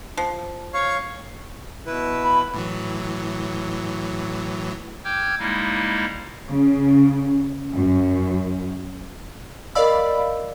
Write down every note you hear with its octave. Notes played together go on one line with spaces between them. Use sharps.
F3
C#5 F5 C#6
B2 E4 B4
B5
A2 E3 F#3
G5 D6 E6 F6 G6 G#6
G3 G#3 A#3 D#4 E4
C#3
F#2
A#4 D5 D#5 F5 B5 E6